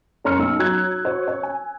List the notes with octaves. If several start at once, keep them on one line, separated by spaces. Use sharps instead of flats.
F#1 C#4 A#5 C6 F6 C#7
B1 E6
F#3 A#5 F#6 G#6
F#4 C5 C#5
C#5
G#5